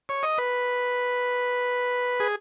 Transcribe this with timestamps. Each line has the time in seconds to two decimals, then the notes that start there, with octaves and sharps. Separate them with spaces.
0.09 C#5
0.23 D#5
0.38 B4
2.20 G#4